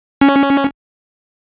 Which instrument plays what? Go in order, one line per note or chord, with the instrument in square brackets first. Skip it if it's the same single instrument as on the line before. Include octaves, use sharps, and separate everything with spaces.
[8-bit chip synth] C#4